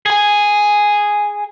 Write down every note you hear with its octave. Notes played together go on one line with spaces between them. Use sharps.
G#4 G#5